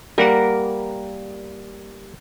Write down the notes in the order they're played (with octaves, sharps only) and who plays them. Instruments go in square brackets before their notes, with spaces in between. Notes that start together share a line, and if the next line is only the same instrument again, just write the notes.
[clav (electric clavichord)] G3 A#3 [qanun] A#4 F#5